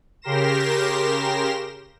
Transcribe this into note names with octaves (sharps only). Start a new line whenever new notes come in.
C#3 G4 A#4 C6 A#6 E7